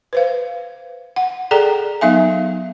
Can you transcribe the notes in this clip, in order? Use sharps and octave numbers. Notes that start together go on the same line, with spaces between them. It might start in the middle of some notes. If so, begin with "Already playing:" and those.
B4 C5 F5
F#5
G#4 A4 D5 G5 A#5
F#3 B3 D#4 E5 F5 G#5